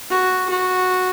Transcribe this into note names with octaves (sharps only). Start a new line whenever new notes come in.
F#4
F#4